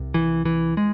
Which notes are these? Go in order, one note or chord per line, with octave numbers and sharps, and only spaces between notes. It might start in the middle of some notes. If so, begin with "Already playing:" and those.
Already playing: C2 C3
E3
E3
G#3